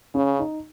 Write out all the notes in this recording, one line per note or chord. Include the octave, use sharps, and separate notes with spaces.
C#3 C#4
D#4